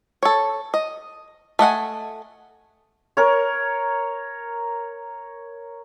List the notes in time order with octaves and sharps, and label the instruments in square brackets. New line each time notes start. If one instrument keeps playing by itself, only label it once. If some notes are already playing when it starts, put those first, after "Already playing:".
[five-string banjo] A4 C#5
D#5
A3 D#5 F#5 G#5
[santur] A#4 C#5